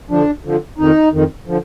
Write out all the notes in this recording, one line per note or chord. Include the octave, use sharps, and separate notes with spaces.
F2 D3 F3 D4
F2 D3 F3
F2 D#3 D#4
F2 D#3
D3 F3